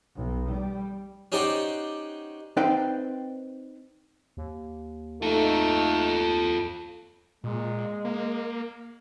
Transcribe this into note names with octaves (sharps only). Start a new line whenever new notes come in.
B1
G3
C#4 D#4 G4 C5 D5 F#5
C4 D#4 B4 C5 D5 G5
D#2
A3 D#4 F4 A4
A#2 G#3
A#3